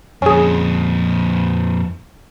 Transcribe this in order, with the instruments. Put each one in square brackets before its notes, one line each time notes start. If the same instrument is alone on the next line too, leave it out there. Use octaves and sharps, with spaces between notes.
[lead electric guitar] F2 A#2 [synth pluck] C#4 G#4